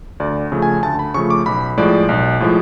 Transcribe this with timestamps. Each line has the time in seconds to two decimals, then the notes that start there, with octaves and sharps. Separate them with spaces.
0.20 D2 D5
0.52 C#3 F3 A3
0.62 G#5
0.83 D2 A5
0.99 B5
1.14 C#3 F3 A3 C#6
1.30 D6
1.46 B1 B5
1.77 A2 F3 G#3 D5
2.09 B1
2.40 A2 F3 G#3